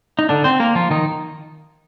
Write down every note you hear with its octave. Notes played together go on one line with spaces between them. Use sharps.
D#4
D3 D4
C4 C5
A#3 A#4
F3 F4
D#3 D#4